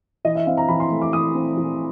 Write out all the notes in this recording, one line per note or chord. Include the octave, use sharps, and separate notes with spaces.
E3 D#5
E5
C4 F5
A#5
E3 B5
C6
A3
D6
E3 D#6
C4
E3